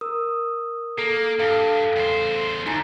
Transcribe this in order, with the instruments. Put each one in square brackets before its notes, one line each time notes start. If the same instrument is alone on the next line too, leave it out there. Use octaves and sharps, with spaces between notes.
[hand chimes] A#4 D#6 E6
[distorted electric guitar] A#3 [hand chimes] A4
[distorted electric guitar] G2 [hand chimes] A4 F5
[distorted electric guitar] E2 C5
[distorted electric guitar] D2 [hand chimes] D#4 G#5 A#5